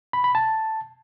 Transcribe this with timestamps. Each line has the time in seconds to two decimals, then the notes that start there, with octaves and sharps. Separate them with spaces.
0.13 B5
0.24 B5
0.35 A5